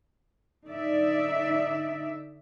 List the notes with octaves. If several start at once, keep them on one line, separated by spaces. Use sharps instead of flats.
D3 D#4 D5 E5